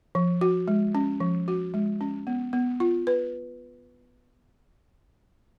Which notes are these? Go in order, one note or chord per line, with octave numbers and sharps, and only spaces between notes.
F3
F#4
G#3
C#4
F3
F#4
G#3
C#4
B3
B3
F4
B4